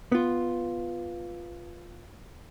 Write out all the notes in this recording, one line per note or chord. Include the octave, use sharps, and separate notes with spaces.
B3 F4